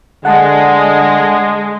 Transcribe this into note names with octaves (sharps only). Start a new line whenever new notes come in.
D3 G#3 F#5 A5